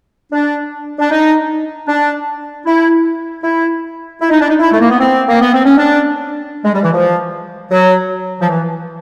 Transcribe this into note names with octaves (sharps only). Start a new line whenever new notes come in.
D4
D4
D#4
D4
E4
E4
E4
D#4
D4
D#4
E4
A3
A#3
B3
C4
A#3
B3
C4
C#4
D4
G#3
G3
E3
F3
F#3
F3
E3